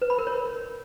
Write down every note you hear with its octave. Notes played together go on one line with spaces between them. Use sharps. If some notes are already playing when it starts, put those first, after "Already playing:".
B4
B5
A#4
C#5